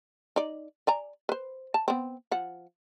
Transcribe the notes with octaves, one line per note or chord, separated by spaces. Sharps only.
D#4 D5
D5 G#5 A#5
B4 C5
A5
B3 C4
F3 F#5